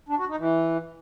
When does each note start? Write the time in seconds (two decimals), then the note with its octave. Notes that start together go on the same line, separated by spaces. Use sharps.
0.09 D4
0.19 F#4
0.29 D#4
0.38 E3